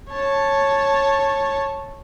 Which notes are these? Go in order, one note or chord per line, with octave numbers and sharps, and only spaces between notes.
C#5 A5